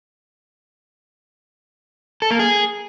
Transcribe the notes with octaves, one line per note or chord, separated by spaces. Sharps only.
A4
A#3
G#4